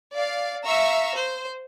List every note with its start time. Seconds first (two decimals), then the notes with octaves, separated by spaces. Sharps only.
0.14 D5 F5
0.66 E5 F5 A#5 C#6 E6
1.14 C5